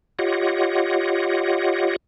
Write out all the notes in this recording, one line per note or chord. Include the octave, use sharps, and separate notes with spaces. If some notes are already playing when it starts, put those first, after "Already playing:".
F4 G4 C#5 D#5 F#5